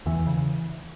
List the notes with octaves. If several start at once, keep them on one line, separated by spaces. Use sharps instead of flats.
E2 E3
C#3